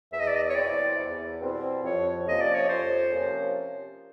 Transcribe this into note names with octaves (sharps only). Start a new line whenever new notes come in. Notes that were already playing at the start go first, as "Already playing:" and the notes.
E2 E5
D#5
D5
D#5
C#5
B2 G3 C4 E4 D5
E2
B2 G3 C4 E4
F2 C#5
C3 F3 A#3 C#4 D#5
D5
C#5
F2 C5
C3 F3 A#3 C#4